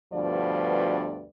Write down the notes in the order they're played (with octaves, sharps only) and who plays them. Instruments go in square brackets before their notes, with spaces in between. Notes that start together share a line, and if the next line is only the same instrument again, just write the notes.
[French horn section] D2 G2 B2 F3 D5